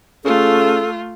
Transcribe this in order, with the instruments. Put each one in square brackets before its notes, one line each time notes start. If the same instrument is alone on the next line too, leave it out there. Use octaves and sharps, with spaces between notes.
[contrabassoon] C#3 [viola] A3 F4 [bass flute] A4